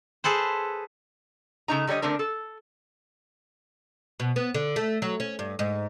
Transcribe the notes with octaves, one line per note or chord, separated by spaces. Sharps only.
G#4 A4 B4 C5
C#3 A3 D#4 A#5
D3 G3 A4 C#5 D#5
D3 A3 C4 D4 A#4
A4
B2
B3
D3
A3
F#3
C#4
G2
G#2